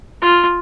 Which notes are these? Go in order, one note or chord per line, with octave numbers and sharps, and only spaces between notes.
F4